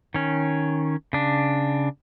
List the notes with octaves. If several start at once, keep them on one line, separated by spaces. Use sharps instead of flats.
D#3 C#4
C#3 D4